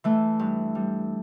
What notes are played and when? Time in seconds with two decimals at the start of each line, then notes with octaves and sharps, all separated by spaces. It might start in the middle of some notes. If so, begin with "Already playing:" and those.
0.04 E3 A3
0.39 G2
0.75 G3